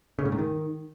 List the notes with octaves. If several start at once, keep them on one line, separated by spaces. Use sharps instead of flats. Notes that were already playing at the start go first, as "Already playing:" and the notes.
C#3
A2
G#2
D#3